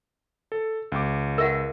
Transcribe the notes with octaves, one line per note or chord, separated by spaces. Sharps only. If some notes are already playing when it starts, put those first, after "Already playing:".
A4
C#2 D6
A#4 E5 F#5